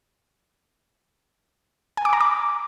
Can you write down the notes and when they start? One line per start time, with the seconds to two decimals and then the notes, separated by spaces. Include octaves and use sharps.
1.97 G#5
2.05 D6
2.13 A#5
2.21 D6